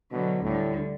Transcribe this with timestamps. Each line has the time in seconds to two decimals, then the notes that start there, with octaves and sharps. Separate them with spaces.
0.11 B2 D3 F#3 B3
0.43 D2 A2 D3 G3